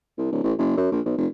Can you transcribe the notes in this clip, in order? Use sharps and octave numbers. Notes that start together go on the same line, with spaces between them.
C2
D1
A1
F#1
F#2
A#1
B1
F1